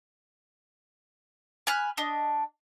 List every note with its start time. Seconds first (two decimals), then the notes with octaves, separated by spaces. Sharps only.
1.67 G#5 B5 F6 F#6
1.97 D4 D#5